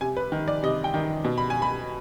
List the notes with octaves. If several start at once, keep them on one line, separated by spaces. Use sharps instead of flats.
C3 G#5
B4
D#3
D5
C3 D#5
G5
D#3
B2
B5
G#5
B5